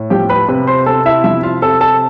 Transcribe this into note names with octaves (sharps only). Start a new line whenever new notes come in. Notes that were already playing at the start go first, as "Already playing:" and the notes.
Already playing: A2
F3 G4 G5
B4 B5
C3 B4 B5
C5 C6
C3 A4 A5
E4 E5
F3 E4 E5
F4 F5
C3 A4 A5
A4 A5